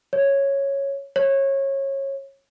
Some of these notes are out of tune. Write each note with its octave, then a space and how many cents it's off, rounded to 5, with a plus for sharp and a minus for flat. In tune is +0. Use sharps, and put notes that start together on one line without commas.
C#5 -5
C#5 -25